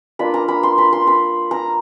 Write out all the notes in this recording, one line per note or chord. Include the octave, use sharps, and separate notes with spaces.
A#3 D4 F4 B5
A#5
B5
C6
B5
C6
B5
A#5